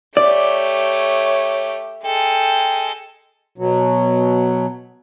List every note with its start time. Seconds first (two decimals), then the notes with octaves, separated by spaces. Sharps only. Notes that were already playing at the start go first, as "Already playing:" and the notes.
0.17 A3 G4 C#5 D5
2.05 G#3 A4 G5
3.58 B2 F#3